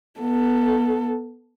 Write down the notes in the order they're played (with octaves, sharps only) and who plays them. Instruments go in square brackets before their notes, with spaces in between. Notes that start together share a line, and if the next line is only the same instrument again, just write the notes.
[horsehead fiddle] B3 A4